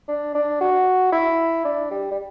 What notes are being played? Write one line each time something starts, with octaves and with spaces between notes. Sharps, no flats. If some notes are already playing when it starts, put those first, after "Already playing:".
D4
D4
F#4
E4
D4
G3
G3